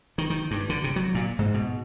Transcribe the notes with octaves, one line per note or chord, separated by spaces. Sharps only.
D#3
D#3
G2
D3
C3
F#3
A#2
G#2
B2